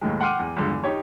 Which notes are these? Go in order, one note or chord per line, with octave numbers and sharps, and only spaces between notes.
D#2 A2 D#3 G#3
F#5 G5 C6 D6 F6 D#7
E2
C#2 G2 D3
E2
D#4 G4 C#5